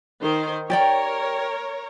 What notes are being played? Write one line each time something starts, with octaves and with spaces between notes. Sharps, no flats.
D#3 C5
G4 A#4 C#5 D5 G5